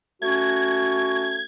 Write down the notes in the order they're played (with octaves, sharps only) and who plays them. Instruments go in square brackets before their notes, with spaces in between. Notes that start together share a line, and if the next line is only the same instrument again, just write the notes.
[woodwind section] A3 C#4 F#4 [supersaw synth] G#6